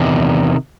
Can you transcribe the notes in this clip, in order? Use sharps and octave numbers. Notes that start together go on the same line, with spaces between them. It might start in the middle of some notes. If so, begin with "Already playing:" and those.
Already playing: E2 C3 D#3 D#5